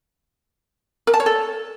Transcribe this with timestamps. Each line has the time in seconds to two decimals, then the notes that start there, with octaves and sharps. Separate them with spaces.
1.07 A#4
1.14 A5
1.20 C#5
1.26 A4